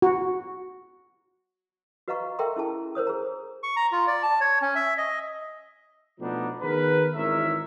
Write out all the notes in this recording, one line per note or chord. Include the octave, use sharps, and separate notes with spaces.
F#4
F#4 B4 D#5 F5 A#5 C#6
A4 A#4 E5 G5 A#5 C6
C#4 E4 G#4 A5
A#4 C5 C#5 D#6
G#4 A#5
C#6
A#5
F4
D5
A5
C#5
C#4
E5
D#5
B2 F3 A3 B3 D4 D#4
D#3 B3 G#4 A#4 B4
G#1 G#2 E3 A#4 C#5 E5